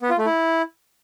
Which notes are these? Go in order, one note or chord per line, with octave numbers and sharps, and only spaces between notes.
B3
F4
A3
E4